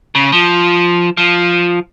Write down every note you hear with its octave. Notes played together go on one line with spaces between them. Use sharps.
C#3
F3
F3